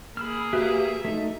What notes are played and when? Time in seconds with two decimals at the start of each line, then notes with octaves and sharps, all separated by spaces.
0.17 A#3 G#4 B5 E6 F6
0.53 F#4 G4 B4 E5 F5
1.05 A3 D#4